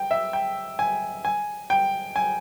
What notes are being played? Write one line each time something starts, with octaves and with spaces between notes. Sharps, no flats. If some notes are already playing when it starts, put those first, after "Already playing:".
Already playing: G5
E5
G5
G#5
G#5
G5
G#5